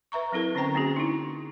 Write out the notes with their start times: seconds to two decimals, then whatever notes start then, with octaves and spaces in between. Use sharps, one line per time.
0.12 B4 E5 A#5 C#6
0.32 F#3 C4 E4 A4 A#4
0.55 D3 C4 C#4 C5 G5 A#5
0.75 A#3 C4 C#4 F#4 G#4
0.96 D#4 E4